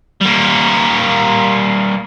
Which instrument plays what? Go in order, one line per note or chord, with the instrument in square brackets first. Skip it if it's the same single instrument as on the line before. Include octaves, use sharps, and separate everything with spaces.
[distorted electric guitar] G3 A#3